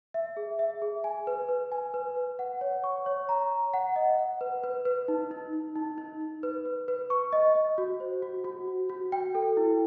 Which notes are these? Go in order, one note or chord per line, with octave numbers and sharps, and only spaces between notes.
E5
G#4
E5
G#4
G#5
B4
B4
G#5
B4
B4
F#5
C#5
C#6
C#5
A#5
A#5
F#5
D#5
F#5
B4
B4
B4
D#4
D#4
D#4
D#4
D#4
D#4
B4
B4
B4
C#6
D#5
D#5
F#4
C5
F#4
F#4
F#4
F#4
G5
A4
E4